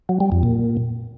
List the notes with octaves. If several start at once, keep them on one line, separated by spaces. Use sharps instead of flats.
F#3
G3
F2
A#2